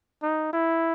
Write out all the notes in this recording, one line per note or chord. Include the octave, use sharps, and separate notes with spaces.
D#4
E4